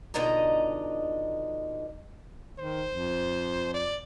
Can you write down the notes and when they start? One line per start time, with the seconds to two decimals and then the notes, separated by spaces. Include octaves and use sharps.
0.14 F2 B2 D3 D#4 D#5 A#5
2.59 D#3 C5
2.90 F2
3.74 D5